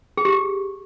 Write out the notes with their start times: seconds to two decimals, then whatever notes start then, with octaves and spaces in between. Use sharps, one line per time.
0.17 G#4
0.25 G4